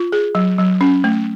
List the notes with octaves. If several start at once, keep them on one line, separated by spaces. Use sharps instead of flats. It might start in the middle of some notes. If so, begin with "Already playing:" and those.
Already playing: F4
G#4
F#3
F#3
C#4
A3